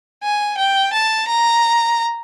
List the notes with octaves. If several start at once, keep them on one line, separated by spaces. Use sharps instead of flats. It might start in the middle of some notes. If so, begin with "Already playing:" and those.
G#5
G5
A5
A#5